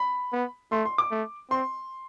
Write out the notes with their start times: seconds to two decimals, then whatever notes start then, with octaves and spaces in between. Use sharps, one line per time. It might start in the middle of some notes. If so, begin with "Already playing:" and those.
Already playing: B5
0.32 B3
0.72 A3 C6
0.85 C6
0.98 D6
1.11 A3
1.51 C4 C6